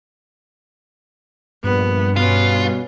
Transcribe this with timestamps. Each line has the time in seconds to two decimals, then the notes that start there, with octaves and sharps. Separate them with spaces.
1.64 A#1 G2 B3
2.16 B2 B3 C#4 F4